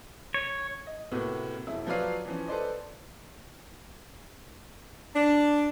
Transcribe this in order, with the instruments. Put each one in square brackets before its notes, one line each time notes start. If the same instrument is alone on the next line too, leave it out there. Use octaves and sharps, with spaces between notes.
[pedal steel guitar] C#5
[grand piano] D#5
A2 C3 A#3 B3 F#4
E1 F2 E4
F3 F#3 B4 C#5 D5 F5
E3 F3 C#4
A4 B4 C5 D5 D#5
[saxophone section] D4